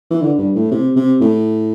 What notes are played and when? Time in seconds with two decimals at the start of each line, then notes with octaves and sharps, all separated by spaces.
0.11 E3
0.22 D3
0.38 G2
0.55 A2
0.72 C3
0.96 C3
1.21 A2